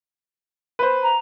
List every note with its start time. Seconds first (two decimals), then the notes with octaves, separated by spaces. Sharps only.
0.79 B4 C5
1.03 A#5